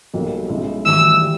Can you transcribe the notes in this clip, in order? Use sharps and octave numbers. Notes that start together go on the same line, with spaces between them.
B1 B2 G3 A#3
B1 B2 G#3 C#4 E4
G#1 G2 E3 A3 E6
E3 G3